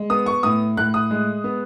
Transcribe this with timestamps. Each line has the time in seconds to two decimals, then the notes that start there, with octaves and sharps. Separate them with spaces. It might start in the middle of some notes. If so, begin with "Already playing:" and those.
Already playing: G#3
0.10 B3 D#6
0.26 C#6
0.43 A2 D#6
0.77 A2 F#6
0.94 D#6
1.11 G#3
1.44 B3